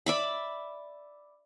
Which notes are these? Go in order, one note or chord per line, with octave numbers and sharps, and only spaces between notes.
D5 E5 B5